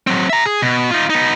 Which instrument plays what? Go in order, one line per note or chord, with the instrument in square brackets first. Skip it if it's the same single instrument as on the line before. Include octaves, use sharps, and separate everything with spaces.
[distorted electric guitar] F#3 C4
E5 A#5
G#4
B2
D#4 F4
B3 D#4